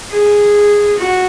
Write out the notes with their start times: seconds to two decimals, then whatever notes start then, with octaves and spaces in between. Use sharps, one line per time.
0.10 G#4
0.98 F#4